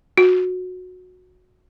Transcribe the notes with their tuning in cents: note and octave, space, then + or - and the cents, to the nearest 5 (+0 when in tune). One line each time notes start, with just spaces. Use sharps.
F#4 -20